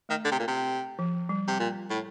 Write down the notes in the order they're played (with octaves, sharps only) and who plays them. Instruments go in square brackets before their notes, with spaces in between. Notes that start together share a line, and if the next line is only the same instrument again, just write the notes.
[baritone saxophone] D#3 [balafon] A3
[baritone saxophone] D3
C3
A#2
C3
[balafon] F3
G3
[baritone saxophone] C3
A#2
A2